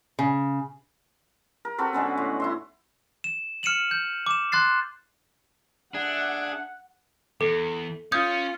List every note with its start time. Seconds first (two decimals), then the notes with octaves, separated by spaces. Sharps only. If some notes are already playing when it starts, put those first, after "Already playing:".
0.19 C#3
1.65 A#4
1.78 C4 F#4 A4 B4
1.93 D3 G#3 B3 C#4
2.17 A2
2.40 E4 E5 C6
3.24 E7
3.63 F6 C#7 D#7 E7 F#7
3.91 G6
4.26 D6 E7
4.52 C6 F#6 A6 C7
5.94 D4 G#4 E5 F#5
7.41 E2 A4
8.12 C#4 F4 D#6 G6 G#6